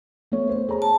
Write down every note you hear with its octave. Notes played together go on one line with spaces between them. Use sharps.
A3 B3 C#5
C5
G#4 C#5 A#5
A5